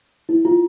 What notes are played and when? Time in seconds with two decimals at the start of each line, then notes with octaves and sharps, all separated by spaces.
0.29 E4
0.45 F4